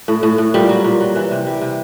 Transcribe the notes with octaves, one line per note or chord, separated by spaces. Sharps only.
A2
A2
A2
A#2 G3
F#3
A#2
F#3
E3
C3
G3
C3